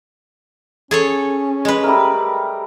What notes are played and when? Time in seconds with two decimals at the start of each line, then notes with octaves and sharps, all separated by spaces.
0.91 C#4 G#4 A4 C#5
1.65 G#3 B4
1.84 G3 A3 A#4